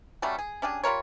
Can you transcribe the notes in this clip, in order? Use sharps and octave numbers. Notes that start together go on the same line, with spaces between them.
F#3 G3 A3 C#4
G#4
C#4 D4 G4 G#4
G3 F4 A#4 C#5